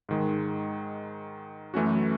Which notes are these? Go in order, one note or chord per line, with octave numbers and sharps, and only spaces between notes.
G#2 D#3 G#3
F#2 E3 A3 C#4 F#4